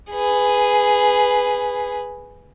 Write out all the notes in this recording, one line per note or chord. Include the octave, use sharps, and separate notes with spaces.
G#4 B4